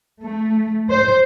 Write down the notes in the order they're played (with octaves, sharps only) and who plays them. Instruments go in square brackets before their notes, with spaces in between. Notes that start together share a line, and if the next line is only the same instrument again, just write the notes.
[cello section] A3
C5